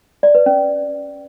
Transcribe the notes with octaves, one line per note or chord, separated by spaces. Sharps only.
D5
B4
C#4